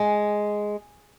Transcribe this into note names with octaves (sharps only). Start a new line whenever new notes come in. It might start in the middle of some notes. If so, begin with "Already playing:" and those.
Already playing: G#3